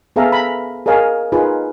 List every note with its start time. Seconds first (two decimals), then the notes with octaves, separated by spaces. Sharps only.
0.16 B3 G#4 A4 E5 F5 A#5
0.32 A#5 B5
0.86 G#4 A#4 C#5 D#5 F5 G#5
1.32 D#4 F4 G#4 B4